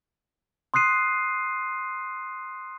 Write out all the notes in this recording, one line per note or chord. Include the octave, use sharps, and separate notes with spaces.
C6 D#6 F#6 C7 D#7